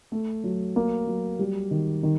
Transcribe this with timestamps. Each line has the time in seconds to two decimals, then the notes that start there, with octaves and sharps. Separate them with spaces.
0.12 A3
0.44 F#3
0.76 A#3
1.07 F#3
1.39 G3
1.71 D#3
2.03 D#3